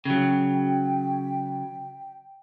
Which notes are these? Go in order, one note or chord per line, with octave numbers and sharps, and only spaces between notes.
C#3 F#3 G5